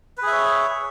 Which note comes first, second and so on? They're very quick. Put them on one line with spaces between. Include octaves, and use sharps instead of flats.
B4 G#4 E5 C#5